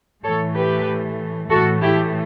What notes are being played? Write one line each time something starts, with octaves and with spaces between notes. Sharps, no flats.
A2 E3 A3 A4 C#5
G4 B4
A2 E3 A3 F#4 A4
E4 G4